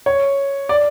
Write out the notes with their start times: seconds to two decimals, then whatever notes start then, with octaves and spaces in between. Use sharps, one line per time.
0.06 C#5
0.69 D5